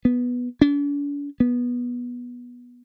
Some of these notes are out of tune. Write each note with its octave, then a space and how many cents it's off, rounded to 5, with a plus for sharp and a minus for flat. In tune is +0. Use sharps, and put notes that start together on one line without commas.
B3 -5
D4 -45
B3 -15